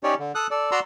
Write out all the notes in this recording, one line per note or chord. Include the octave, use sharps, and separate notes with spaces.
C#4 D#4 G4 C#5 D5
D3
A4 D#6 F#6
A4 D5
F#4 D5 A#5 C6 E6